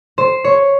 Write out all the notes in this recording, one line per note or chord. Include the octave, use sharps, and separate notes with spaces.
C5
C#5